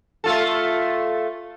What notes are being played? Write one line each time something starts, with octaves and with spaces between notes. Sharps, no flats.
A3 F4 A4